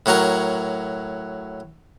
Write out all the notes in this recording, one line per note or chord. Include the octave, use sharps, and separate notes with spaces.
A2 F#3 F#4 A#4